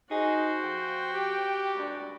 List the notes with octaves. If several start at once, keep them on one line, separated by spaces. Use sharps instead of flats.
D#4 F#4 G#4 C5
F2 G5
G4
C#2 G2 D4